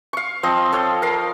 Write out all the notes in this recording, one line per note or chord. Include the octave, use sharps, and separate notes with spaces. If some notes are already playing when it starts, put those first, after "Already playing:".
F5 C#6
F3 C4 D#5
A4 C#5 G5
A#4 F5